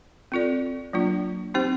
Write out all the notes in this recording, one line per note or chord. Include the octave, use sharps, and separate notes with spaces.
C4 F4 A4 D5
F#3 A#3 D4 F4
C4 D#4 G4 C5